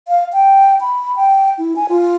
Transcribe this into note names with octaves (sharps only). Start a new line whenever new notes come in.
F5
G5
B5
G5
E4
G#5
F4